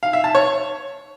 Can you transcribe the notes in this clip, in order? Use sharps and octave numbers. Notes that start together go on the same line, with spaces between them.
F5
E5
A5
C#5